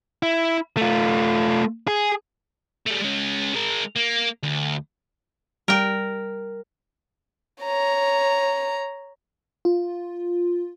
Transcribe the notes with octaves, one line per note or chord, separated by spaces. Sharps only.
E4
A3 F4
G#4
G3 A3
G#3 C#4
G#3 A#4
A#3
D2
G3 A#4 G5
C#5 A#5
F4